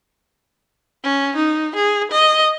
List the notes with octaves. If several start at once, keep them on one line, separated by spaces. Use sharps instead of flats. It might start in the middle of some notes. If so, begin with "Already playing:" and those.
C#4
D#4
G#4
D#5